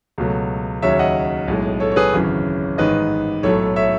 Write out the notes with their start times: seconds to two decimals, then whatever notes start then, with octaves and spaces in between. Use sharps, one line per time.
0.18 C#2 B2 F#3 A3
0.82 D#2 C#3 F#3 C#5 E5
0.99 D#5 F#5
1.48 B1 A2 G#3
1.80 A4 C#5
1.91 C#5
1.96 G#4 B4
2.13 G#1 F#2 C#3 E3
2.78 A1 G#2 D#3 B4 D#5
3.43 B1 A2 F#3 A3 A4 C#5
3.76 C#5 E5